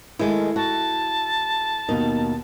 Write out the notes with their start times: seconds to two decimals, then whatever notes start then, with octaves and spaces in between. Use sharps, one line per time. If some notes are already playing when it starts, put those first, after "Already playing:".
0.19 D#3 G#3 A3 E4 A4
0.56 F#4 A5
1.89 D#2 B2 D#4 A#4